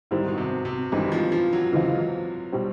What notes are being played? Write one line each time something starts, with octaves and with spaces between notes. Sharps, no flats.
G#2 D#3 G3 C4 E4
B2
C3
C3
G2 D#3 E3 G#3 C4
F3
F3
F#3
C#3 E3 G#3 C4 F4
B2 G3 C4